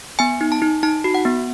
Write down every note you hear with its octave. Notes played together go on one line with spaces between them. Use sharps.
B3 G#5
D#4
A5
D#4
D#4 A5
F#4
F#5
B3